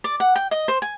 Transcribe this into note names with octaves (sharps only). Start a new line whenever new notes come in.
D5
F#5
G5
D#5
C5
G#5